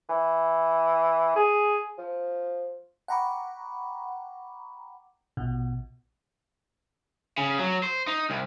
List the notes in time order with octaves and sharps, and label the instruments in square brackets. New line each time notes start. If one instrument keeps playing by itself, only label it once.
[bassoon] E3
G#4
F3
[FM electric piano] F#5 G5 A#5 B5 C#6 D6
A#1 B2
[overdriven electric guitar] C#3
F#3
C5
D#4
C2